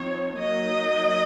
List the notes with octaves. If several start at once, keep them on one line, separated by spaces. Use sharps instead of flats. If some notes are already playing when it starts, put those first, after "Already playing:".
Already playing: F3 C4 D#4 C#5
F#3 A#3 D#4 D#5